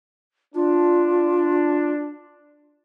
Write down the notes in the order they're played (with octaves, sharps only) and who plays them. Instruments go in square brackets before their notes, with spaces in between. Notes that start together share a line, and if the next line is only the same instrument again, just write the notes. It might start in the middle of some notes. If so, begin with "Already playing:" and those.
[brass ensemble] D4 [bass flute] F4